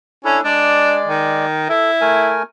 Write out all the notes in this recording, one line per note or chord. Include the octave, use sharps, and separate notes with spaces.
C#4 D4 E4 A4
G#3 D4 D5
D#3
E4 A4
A3 A#4 G#5